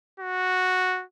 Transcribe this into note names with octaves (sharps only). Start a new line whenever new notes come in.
F#4